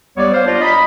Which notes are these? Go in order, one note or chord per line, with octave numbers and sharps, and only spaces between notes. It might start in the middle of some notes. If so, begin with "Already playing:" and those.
D#2 G3 B3 C#5 D5
C5 F5
D4 F4 D5 D#5
D#5 A#5 B5